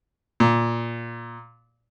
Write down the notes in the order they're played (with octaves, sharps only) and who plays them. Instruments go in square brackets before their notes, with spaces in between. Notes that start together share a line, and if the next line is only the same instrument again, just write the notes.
[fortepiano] A#2